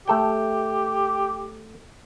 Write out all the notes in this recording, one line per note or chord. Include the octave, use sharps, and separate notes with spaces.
A3 G4 A4 G5